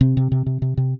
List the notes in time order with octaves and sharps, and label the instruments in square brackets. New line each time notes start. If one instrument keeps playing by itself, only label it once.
[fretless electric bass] C3 C4
C3
C3
C3
C3
C3